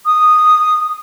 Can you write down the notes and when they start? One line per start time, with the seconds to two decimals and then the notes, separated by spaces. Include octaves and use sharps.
0.05 D#6